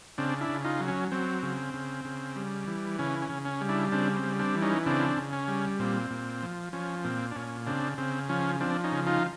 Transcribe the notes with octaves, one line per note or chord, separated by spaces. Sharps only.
C#3 C4 D4
D4 E4
C#3
D#4 F4
F#3
C#4
F#3 C4
C#3
C#3
C#3
G3
E3
C#3 C#4
C#4
C#3
C#4
G3
D4 E4
C#3 C4 D4
C4
G3
C4 D4
E3
C#4 D#4
C#3 C4 D4
C#3
C#4
G3
A#2 C4
A#2
F3
F3 C#4
A#2 C4
D4
A#2 C#4
C#3 C4 D4
C#3 C4
F3 C#4
F3 C4 D4
C#4 D#4
C#3
D#4 F4